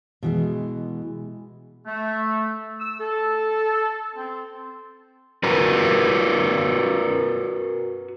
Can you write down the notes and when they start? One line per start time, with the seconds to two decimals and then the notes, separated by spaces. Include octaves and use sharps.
0.23 B2 E3 G#3
1.86 A3
2.80 E6
3.00 A4
4.16 C4
5.43 F#4 A#4 B4